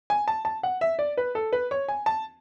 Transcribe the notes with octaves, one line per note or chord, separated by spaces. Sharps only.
G#5
A5
A5
F#5
E5
D5
B4
A4
B4
C#5
G#5
A5